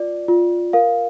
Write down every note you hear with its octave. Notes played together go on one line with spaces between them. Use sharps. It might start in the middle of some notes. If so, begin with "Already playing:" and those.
Already playing: F4 D5
F4
A#4 F5